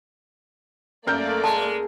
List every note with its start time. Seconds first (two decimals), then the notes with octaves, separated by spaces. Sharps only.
1.07 F#2 A3 A#3 A#4 D5 G6
1.44 G#3 A5